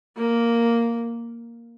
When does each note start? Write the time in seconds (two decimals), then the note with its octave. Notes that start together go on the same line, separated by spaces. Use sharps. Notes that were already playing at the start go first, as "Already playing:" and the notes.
0.16 A#3